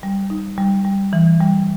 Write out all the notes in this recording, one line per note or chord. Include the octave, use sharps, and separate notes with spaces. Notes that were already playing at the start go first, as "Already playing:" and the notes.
G3
D#4
G3
G3
E3
G3